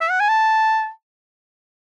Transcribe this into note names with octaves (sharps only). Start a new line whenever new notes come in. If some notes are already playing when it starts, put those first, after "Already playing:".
E5
F#5
G#5
A5